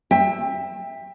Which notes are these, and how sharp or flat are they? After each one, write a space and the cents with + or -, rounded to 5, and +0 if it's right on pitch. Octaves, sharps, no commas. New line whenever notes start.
E5 +0 G5 +25